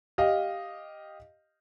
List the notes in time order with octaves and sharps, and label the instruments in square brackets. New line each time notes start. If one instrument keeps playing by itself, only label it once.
[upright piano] G4 D#5 F5